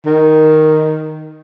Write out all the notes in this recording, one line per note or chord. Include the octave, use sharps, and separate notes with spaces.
D#3